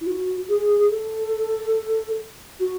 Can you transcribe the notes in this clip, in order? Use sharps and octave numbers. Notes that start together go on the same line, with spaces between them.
E4
F#4
G#4
A4
F#4